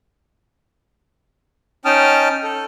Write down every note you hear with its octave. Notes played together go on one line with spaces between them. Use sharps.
C#4 D#4 G5 A5 D#6 F6
A4